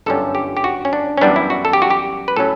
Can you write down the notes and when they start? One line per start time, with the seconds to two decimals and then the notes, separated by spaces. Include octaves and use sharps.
0.06 G1 F#2 D3 G3 C#4 A4
0.35 G4
0.57 G4
0.64 F#4
0.85 C#4
0.93 D4
1.17 C#4
1.21 F#2 E3 G3 B3 D4
1.36 E4
1.50 F#4
1.65 A4
1.73 G4
1.82 F#4
1.90 G4
2.28 B4
2.36 A2 F#3 C#4 A4